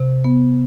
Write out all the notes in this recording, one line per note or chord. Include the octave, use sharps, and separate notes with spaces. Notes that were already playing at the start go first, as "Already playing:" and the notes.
Already playing: C3
B3